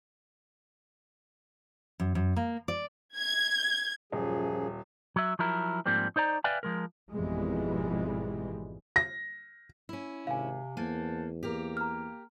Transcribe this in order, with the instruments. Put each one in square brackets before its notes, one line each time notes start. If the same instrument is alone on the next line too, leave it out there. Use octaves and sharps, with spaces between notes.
[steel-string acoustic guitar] F#2
F#2
A#3
D5
[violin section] G#6
[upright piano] D#1 [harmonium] F#2 F3 G#4
[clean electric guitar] F#3 E5
F3 F#3 E4 A#4
G#2 F3 G3 A#3 C4
D#4 C5 D5 A#5
B4 D5 E5 F5 G5 G#5
F3 G#3 A#4
[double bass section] G#1 F2 B2 E3 G3 G#3
[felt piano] A#6
[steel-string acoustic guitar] C#4 E4
[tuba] G#1 [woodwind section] C3 [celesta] F5 G#5
[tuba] E2 [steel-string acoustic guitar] A#3 [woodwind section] C5 F#5 A5
[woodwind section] A#3 [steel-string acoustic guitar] G4 A#4
[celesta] A#5 F6